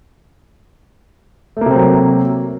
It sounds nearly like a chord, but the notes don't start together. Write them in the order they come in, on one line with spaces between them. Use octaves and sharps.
A3 A#3 C3 C4 F#3